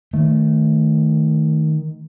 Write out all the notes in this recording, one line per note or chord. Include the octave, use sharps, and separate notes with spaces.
D#3 A3